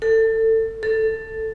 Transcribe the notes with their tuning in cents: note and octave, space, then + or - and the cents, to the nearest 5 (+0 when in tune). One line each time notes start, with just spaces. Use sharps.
A4 +25
A4 +5